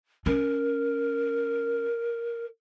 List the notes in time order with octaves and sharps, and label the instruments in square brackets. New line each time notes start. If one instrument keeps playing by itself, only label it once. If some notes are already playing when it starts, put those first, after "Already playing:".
[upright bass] C#4 [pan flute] A#4